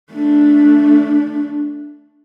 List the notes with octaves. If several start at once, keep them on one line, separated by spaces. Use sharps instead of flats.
A3 D4